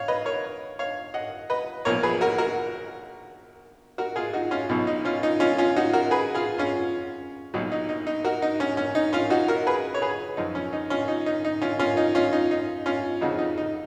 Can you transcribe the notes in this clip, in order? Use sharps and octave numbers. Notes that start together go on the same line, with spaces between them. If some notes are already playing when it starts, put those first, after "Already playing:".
Already playing: C#5 F5
B4 D#5
A#4 C#5
C#5 F5
D#5 F#5
B4 D#5
B1 A#2 F3 A#4 C#5
G#4 B4
F#4 A#4
F#4 A#4
F#4 A#4
F4 G#4
D#4 F#4
C#4 F4
B1 B2 F#3 D#4
D#4
C#4 F4
D#4
C#4 F4
C#4 F4
D#4 F#4
F#4 A#4
G#4 B4
F4 G#4
C#4 F4
B1 A#2 F#3 D#4
D#4
D#4
D#4
F#4 A#4
D#4
C#4
C#4
D#4
C#4 F4
D#4 F#4
F#4 A#4
G#4 B4
C#5
G#4 B4
F#2 F3 D#4
C#4
D#4
C#4 F4
D#4
D#4
D#4
C#4 F4
C#4 F4
D#4
C#4 F4
D#4
D#4
C#4 F4
F2 C#3 F3 D#4 F#4
D#4
D#4